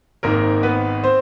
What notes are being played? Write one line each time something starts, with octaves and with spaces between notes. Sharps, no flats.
G#1 G#2 D#3 A#3 A#4
B3 B4
C4 C5